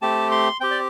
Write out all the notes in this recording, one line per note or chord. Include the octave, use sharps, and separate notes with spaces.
A3 C4 G4 A5
C6
C4 G4 G5
D5